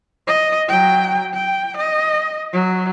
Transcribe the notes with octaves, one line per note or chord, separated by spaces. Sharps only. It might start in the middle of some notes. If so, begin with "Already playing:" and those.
D#5
F#3 G5
G5
D#5
F#3